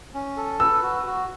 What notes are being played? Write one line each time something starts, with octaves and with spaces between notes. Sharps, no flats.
C#4
A4
B4 E6
F#4
F#4